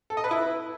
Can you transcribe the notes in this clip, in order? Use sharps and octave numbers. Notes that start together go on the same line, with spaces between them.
A4
D#5
B4
E4